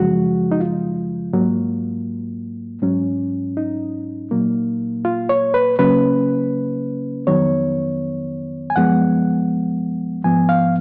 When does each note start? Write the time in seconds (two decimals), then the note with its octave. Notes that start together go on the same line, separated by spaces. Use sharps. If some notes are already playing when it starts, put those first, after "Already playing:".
Already playing: F#2 C#3 F3 G#3 F#4
0.51 D#4
0.60 F4
1.33 G#2 F#3 A#3
2.82 G#2 F#3 C#4
3.57 D#4
4.31 A#2 F#3 A#3
5.05 F4
5.29 C#5
5.54 B4
5.79 C#3 F#3 A#3 C#4 B4
7.27 F2 D#3 F#3 B3 C#5
8.70 G#5
8.76 F#2 F3 G#3 B3 F#5
10.24 G#2 F3 B3 G#5
10.49 F5